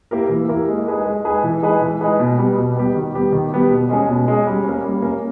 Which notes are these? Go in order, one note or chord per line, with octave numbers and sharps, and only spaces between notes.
A#3 E4 G4 A#4
E3
A#3 E4 G4 A#4
G#3
D#4 G#4 B4
G#3
D#4 G#4 B4
E3
G#3 D#4 G#4 B4
E3
G#3 D#4 G#4 B4
B2
G3 B3 G4
B2
G3 B3 G4
D#3
G3 B3 G4
D#3
G3 B3 G4
B2
G#3 C#4 G#4
B2
G#3 C#4 G#4
G3
A#3 C#4
G3
A#3 C#4